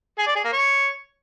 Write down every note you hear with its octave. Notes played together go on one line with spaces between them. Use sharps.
G#4
D5
G#4
A#3
C#5